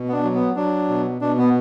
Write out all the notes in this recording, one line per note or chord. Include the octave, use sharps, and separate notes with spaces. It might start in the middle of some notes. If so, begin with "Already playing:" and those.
Already playing: B2
B3
D4
F#3
B3
F#3 D4
B2
B2 D4
B3